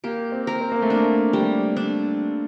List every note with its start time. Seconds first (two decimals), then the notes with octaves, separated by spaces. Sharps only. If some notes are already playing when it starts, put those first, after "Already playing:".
0.04 A#3 G4
0.32 C4
0.47 A#4
0.61 C4
0.72 A#3
0.82 A3
0.90 A#3 D4
1.33 G3
1.77 D4